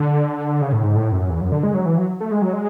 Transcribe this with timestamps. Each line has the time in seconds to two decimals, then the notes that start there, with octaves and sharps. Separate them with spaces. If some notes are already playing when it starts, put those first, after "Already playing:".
Already playing: D3
0.62 C#3
0.72 A2
0.83 G#2
0.96 A2
1.12 F#2
1.29 E2
1.41 F#2
1.52 D3
1.63 G#3
1.74 F#3
1.85 E3
1.98 F#3
2.20 A3
2.31 G#3
2.42 F#3
2.53 G#3